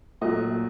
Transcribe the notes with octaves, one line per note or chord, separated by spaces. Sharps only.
A#2 F#3 A3 D#5